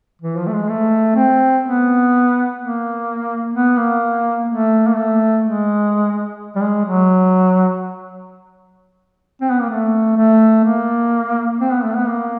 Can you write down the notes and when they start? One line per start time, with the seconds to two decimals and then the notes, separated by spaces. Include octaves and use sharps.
0.21 E3
0.37 F3
0.47 A3
0.53 G#3
0.69 A3
1.15 C4
1.63 B3
2.58 A#3
3.54 B3
3.77 A#3
4.48 A3
4.87 A#3
4.95 A3
5.43 G#3
6.55 G3
6.62 G#3
6.85 F#3
9.41 C4
9.50 B3
9.61 A#3
9.70 A3
10.17 A3
10.64 A#3
11.61 C4
11.72 B3
11.83 A3
11.96 B3
12.07 A#3